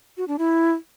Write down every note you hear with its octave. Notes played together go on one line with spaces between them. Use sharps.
F#4
D4
E4